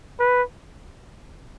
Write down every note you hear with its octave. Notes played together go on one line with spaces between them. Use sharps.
B4